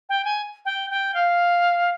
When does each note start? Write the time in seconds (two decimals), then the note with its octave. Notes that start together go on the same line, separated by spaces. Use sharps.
0.09 G5
0.25 G#5
0.65 G5
0.90 G5
1.14 F5